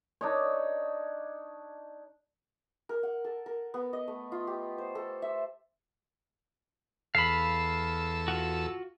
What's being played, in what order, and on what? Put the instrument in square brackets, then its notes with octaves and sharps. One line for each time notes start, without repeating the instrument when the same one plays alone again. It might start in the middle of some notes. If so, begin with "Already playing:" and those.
[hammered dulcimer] D4 D#4 C#5
[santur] A#4
F#5
A4
A#4
B3
D#5
A3
F4
G4
C5
A4
E5
[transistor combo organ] E2 A4 E6 [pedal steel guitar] F5 B5
[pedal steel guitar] F4 F#4